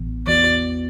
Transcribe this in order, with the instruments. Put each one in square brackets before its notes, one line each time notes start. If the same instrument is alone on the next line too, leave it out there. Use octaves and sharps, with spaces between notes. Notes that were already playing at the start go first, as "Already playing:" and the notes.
Already playing: [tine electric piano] A1 A2 E3 B3
[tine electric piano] E2 E3 B3 F#4 [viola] D5